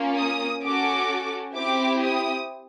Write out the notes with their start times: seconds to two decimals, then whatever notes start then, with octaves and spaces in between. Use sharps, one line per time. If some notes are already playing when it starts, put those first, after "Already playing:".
Already playing: A#3 C#4 F4
0.16 D#6
0.62 C#4 F#4 A4 D6
1.55 C4 E4 G4 D6
2.01 D#6